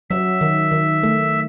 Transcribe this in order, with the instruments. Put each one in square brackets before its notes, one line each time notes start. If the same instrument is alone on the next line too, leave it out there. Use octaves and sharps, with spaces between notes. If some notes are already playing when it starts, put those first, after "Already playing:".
[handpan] F#3 [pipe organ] E5
[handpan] D#3
D#3
A3